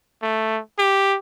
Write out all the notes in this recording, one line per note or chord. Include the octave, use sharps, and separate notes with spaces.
A3
G4